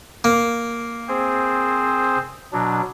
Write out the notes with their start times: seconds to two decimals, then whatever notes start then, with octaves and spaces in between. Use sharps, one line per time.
0.24 A#3
1.09 C4 G#4 C5
2.53 B2 F#3 D4